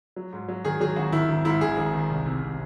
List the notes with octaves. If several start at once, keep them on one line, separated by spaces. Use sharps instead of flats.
F#3
G#2
F#3
D#3 G#4
F#3 G#4
G#1 F#4
D#3 E4
G#1
G#2 E4
G#1 G#4
G#1
D#3
C2
C3
C3